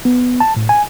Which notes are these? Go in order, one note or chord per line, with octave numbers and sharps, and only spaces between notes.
B3
A5
A2
G#5